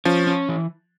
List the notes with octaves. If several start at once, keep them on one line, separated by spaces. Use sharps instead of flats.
F3 C#4
C#4
E3